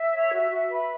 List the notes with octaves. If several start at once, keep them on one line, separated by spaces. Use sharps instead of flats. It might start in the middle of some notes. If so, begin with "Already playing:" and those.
Already playing: E5
C#5
F#4
F#4
B4